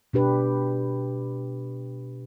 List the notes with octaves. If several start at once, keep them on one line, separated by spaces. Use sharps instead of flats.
B2 D4 G4 B4